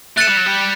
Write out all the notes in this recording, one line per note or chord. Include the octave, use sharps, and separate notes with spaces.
A3 F#6 A6 C#7 E7
G3
F#3
G3